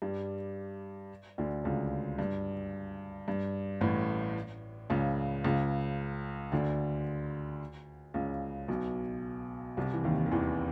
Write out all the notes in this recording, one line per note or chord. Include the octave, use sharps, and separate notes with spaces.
G2 G3
D2 D3
C#2 C#3
G2
G2
A1 A2
C#2 C#3
C#2 C#3
D2 D3
C#2 C#3
B1 B2
C2 C3
E3
D#2 D#3
D#3
E2 E3